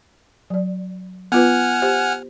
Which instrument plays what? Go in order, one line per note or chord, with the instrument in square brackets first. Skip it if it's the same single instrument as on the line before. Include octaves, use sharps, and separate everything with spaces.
[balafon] F#3 D5
[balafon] B3 F4 B4 [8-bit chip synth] F#5 G#5 F6
[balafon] G4 C5